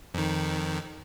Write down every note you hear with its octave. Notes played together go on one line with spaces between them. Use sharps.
F2 D#3